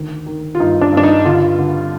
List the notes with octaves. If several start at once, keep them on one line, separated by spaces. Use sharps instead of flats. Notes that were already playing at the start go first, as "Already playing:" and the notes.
Already playing: D2 D#3
D#3
F4
G2 D#4
D4
G2 D4
D#4
D3 F4
D3